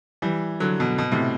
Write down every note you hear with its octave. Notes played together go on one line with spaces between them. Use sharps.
E3 G3
D3 F#3
B2
B2
A2 C3